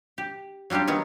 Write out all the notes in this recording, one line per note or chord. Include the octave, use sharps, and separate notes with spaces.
G4
F#3 G3 D4 F4 G4
D#3 F#3 B3